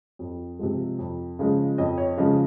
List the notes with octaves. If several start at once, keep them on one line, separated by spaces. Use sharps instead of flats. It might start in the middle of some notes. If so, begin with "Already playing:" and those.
F2
C3 F3 G#3
F2
C#3 F3 G#3
F2 D#5
C#5
C#3 F3 G#3 D#5